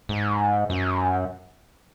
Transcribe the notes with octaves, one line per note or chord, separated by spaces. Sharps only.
G#2
F#2